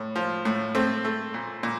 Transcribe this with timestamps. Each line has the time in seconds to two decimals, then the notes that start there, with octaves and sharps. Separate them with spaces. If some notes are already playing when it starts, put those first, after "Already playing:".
Already playing: A2
0.16 F3
0.45 A2
0.75 A3 C4
1.05 A3
1.34 A#2
1.63 A#2